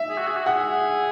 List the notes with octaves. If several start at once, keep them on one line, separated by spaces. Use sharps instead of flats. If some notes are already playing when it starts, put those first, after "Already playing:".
Already playing: E5
G#4
F#4
G#4
F#4
G#4 F#5